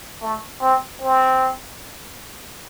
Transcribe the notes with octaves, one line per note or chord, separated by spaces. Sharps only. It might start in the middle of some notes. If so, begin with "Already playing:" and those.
A3
C4
C4